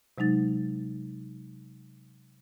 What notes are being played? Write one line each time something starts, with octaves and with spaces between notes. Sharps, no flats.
C3 F#3 G#3 D#4 A6